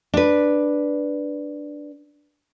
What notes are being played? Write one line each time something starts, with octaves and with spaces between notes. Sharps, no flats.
D4 B4